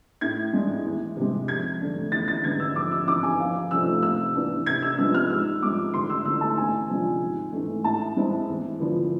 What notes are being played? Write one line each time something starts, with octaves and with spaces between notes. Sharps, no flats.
A2 G#6
G#3 D4
E2
C3 G#3
F2 G#6
D3 A3 D4
E2 A6
A6
D3 G#3 B3 D4 G#6
E6
F2 D6
E6
E3 B3 D6
G#5
F2 F5
C3 F3 A3 C4 E6
C3 E6
E3 B3 D4
C3 G#6
E6
F3 G#3 B3 D4 E6
F6
G#2 E6
F3 G#3 D6
D2 C6
E6
D3 A3 E4 E6
A5
E2 G#5
C3 F3 G#3 D4
G#2
E3 A3
A2 A5
G#3 C4 E4
E2
D3 F3 B3 E4